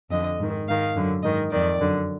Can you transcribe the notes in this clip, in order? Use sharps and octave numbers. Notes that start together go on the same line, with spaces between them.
F2 D3 D#5
G#2 D#3
G#2 D#3 F5
F#2 D3
G#2 D#3 D#5
F2 D#3 D5
F#2 D3